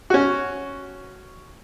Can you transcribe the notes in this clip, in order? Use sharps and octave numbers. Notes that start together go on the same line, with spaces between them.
C#4 F#4